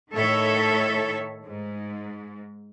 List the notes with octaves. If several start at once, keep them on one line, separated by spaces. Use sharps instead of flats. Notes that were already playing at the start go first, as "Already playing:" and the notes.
A2 D#3 A4 C#5 E5
G#2